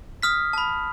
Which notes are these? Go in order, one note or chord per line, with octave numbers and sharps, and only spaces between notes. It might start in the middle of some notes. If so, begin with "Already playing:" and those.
D#6 F6 B6
A5 B5